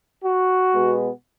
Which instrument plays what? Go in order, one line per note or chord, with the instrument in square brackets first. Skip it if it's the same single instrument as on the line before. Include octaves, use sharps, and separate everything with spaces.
[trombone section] F#4
B2 G#3 B3